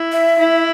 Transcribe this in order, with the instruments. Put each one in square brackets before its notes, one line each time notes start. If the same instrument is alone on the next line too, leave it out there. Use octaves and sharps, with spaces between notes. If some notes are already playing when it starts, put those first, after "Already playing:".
Already playing: [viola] E4
[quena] E5
[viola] E4